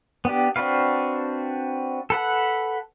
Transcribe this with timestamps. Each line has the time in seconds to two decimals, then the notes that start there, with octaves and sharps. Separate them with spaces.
0.25 B3 D4 G4
0.56 C4 D4 F#4 B4 F5
2.10 A4 B4 F#5